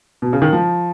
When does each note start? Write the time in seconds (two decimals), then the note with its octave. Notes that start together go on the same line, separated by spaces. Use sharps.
0.22 B2
0.33 C#3
0.42 D#3
0.53 F3